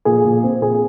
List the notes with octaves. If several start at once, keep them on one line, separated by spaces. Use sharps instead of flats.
A#2 G#4
A#2
C4
A#2 G#4